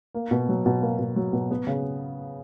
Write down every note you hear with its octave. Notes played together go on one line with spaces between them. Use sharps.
A#3
B2
F#3
B2
A#3
B2
F#3
B2
B3
C#3